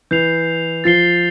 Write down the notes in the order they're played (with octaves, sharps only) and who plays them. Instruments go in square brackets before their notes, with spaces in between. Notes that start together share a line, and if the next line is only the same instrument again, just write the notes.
[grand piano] E3 [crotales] G6 C7 F7
[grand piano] F3 [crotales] A6 C7 G7